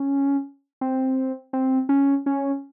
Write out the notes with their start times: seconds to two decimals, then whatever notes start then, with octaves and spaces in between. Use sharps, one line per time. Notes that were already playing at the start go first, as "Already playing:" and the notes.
Already playing: C#4
0.81 C4
1.53 C4
1.89 C#4
2.26 C#4